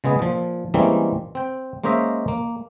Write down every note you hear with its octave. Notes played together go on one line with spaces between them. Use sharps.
C#3 G#3 B3 G#4
A#2 F3
E3 G3 G#3 A#3 C4 C#4
C4 G5
G#3 A#3 C#4 C5 D#5 E5
A#3